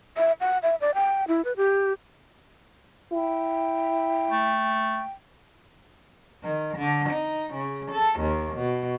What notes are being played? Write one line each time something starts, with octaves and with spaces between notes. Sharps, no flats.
E5
F#5
E5
D5
G5
E4
B4
G4
E4 G5
A3
D#3
D3
D#4
C#3
A4
D#2
B2